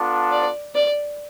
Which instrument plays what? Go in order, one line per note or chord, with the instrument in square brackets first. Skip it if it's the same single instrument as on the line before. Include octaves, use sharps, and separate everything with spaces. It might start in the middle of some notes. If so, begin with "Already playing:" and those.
Already playing: [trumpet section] B3 D4 F4 A4
[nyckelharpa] D5
D5